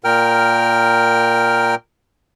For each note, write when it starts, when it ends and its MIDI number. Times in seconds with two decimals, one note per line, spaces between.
0.04 1.75 46
0.04 1.75 70
0.04 1.75 79
0.04 1.75 89